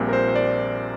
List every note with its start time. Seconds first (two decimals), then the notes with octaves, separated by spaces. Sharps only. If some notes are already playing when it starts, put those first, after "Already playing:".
Already playing: A#1 A#2 G3 C4
0.08 A#4
0.13 C5
0.29 C5
0.35 D5